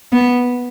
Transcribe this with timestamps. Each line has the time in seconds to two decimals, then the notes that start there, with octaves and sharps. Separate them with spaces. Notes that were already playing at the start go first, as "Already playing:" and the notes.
0.12 B3